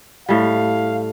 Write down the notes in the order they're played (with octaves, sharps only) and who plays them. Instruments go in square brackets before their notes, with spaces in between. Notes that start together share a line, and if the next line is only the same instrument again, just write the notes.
[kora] A2 G3 [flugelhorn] F5